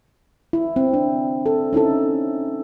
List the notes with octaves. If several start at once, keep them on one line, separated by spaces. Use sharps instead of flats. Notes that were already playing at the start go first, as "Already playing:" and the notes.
E4
C4
D4
A4
C#4 D#4 E4 A4